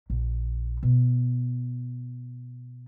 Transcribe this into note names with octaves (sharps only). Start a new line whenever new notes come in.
A#1
B2